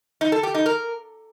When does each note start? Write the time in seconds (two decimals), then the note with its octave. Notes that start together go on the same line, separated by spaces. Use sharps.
0.21 D#4
0.32 A4
0.43 G4
0.55 D#4
0.66 A#4